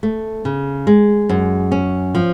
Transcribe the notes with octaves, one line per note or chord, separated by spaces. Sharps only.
A3
C#3
G#3
F#2
C#4
F3